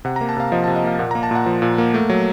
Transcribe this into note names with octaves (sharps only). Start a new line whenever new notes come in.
C3 F#5
A#5
A#3
A5
C3 F5
F3 D#5
A5
C3
D#5
A#3 F5
A#2 F#5
A#5
A#3
A5
A#2 F#5
F3
A#2
A#3
A3
F#3